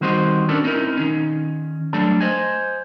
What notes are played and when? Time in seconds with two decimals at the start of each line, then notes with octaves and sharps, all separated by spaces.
0.01 D#3 G3 C4 F#4 C5 D#5
0.49 C#4 D4 F#4 A4 A#4 D5
0.64 C4 C#4 D#4 E4 A#4
0.95 D#3 C#4 D#4
1.93 F#3 G3 A3 D4 A4
2.20 C5 D#5 G#5